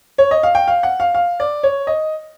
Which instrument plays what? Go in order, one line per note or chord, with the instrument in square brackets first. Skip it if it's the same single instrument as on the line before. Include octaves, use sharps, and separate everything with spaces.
[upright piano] C#5
D#5
F5
G5
F5
F#5
F5
F5
D5
C#5
D#5